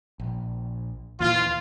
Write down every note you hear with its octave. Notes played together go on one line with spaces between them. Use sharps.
A#1
D#2 A#2 E3 F4